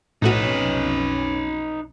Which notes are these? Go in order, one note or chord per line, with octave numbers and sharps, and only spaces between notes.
B1 F2 A2 A3 C#4 D#4 F#4 B4